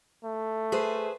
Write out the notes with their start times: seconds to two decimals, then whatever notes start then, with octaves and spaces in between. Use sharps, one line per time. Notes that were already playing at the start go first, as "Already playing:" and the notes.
0.24 A3
0.72 G#4 B4 C5